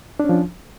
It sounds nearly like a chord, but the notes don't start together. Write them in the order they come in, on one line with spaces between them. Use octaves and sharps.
D4 C#4 F3